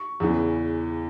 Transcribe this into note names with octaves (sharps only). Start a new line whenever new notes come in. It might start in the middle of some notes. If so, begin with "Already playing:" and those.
Already playing: C#6
E2 C#3 E3